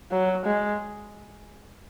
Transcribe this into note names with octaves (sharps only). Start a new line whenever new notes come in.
F#3
G#3